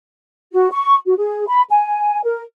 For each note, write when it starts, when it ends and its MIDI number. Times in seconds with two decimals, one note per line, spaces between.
0.53 0.68 66
0.72 0.95 85
1.06 1.14 66
1.18 1.45 68
1.48 1.62 83
1.71 2.19 80
2.24 2.42 70